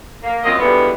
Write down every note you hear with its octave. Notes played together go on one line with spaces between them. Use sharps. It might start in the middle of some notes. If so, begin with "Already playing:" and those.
A#3
F#2 A#3 C4 F4 D#5
B2 D3 E3 G3 G#3 B3